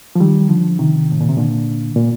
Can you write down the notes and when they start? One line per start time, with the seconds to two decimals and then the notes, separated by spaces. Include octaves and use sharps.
0.15 F3
0.20 D#3 G3
0.49 D3 F3
0.79 C3 D#3
1.12 A2
1.21 A#2
1.29 C3
1.37 A#2 D3
1.96 A#2